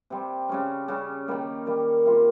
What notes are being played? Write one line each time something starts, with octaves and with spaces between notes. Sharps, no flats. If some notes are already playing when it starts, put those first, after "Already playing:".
C3 G3 C4
C#3 G3 C#4
C#3 G3 C#4
D#3 G3 A#3
D#3 G3 A#3
C3 G3 A#3 F4